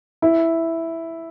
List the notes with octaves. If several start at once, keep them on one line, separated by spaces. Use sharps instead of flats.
E4